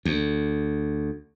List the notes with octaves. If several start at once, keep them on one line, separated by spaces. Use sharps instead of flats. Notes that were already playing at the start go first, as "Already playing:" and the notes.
D2